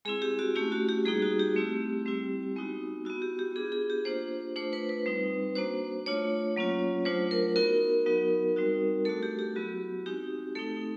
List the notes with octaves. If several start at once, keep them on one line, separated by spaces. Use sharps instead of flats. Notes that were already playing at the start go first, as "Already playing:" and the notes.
G#3 C4 E4 G#4
G4
F#4
A3 C#4 E4 G4
F#4
G4
G3 A#3 D#4 F#4 G#4
F#4
G4
A3 C4 E4
G3 C4 E4
G#3 B3 D#4 F#4
B3 E4 F#4
G4
G4
B3 D4 F4 G#4
G#4
G4
A#3 D4 F4 C5
A3 D4 F4 C5
B4
B4
G3 C4 D#4
A#3 D4 F#4 C5
A3 D4 F4 C#5
F#3 A#3 C#4 F4
F#3 A3 D4 F4 C5
A#4
B3 D#4 F#4 A#4
F#3 B3 D#4 F#4
G3 C4 D#4 F#4
A3 D4 F#4 A4
G4
G4
F#3 B3 E4 F#4
G#3 C4 D#4 F#4 G4
A3 C4 D#4 A4